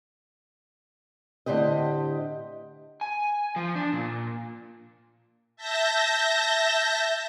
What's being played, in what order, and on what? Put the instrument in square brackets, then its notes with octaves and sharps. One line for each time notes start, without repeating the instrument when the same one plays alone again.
[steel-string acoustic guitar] A2 D3 C4 G4 D#5
[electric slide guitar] G#5
F3
D4
A#2
[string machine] E5 A5 G6 A#6